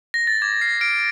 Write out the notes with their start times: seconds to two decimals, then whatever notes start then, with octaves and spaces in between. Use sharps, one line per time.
0.14 A#6
0.27 A6
0.42 D6 G#6
0.61 F6 C7
0.81 F6 D7